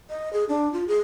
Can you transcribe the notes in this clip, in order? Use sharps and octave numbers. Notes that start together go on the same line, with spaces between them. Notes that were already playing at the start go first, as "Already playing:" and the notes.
D#5
G#4
D4
F4
G#4